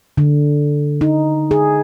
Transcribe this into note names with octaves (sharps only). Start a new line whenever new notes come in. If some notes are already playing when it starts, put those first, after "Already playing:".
D3
D#4
G#4